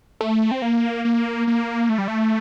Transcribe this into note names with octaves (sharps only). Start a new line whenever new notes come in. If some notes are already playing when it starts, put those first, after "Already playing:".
A3
C4
A#3
A#3
A#3
A3
G3
A3